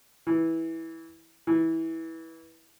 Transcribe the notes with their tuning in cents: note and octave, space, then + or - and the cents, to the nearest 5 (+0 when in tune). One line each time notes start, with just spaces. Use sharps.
E3 -10
E3 -15